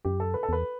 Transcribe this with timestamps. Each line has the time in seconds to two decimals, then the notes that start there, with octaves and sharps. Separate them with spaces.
0.05 F#2 G4
0.20 A4
0.34 B4
0.43 A4
0.49 E2 B4